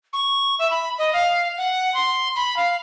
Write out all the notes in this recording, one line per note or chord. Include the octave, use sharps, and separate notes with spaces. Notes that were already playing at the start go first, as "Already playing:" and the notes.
C#6
E5
B5
D#5
F5
F#5
C6
B5
F5